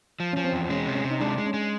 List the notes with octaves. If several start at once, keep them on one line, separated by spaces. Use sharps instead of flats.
F3
F3 C#4
C4
E2
G#3 C#4
C3
C#4
C3
D#4
G#3 D4
G#3
C#4
G#3